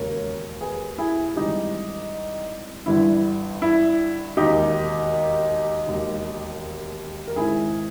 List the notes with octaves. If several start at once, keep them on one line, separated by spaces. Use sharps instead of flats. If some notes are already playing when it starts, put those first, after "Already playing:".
Already playing: E1 D#2 C#3 A#4 C#5
G#4 B4
E4 G#4
G#1 G2 E3 D#4 G4
G1 G2 E3 E4
E4
E1 D#2 D#3 D#4 G4
E1 D#2 D#3
A#4
G#1 G#2 D#3 E4 G#4